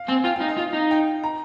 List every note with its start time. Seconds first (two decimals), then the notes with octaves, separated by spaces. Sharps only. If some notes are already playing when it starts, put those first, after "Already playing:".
Already playing: F5
0.08 C4 G#5
0.25 F4 G5
0.36 F5
0.41 D#4
0.48 D#5
0.58 F4 F5
0.74 D#4
0.91 G5
1.24 A#5